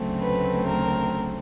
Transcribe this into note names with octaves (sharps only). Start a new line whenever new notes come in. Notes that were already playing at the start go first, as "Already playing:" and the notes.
Already playing: D2 C#3 F#3 A3 C4
B4
A#4